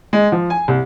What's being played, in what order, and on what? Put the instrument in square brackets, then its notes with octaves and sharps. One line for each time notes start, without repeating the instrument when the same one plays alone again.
[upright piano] G#3
F3
G#5
C2